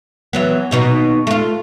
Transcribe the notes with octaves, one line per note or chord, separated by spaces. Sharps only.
E3 F#3 B3
D#2 B2 D#4
A3 F4